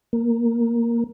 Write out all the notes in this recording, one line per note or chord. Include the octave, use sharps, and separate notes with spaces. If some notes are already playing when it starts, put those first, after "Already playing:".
A#3